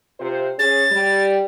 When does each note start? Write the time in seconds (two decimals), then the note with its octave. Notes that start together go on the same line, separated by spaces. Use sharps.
0.20 C3 F4 C5
0.59 C#4 G#4 A6
0.92 G3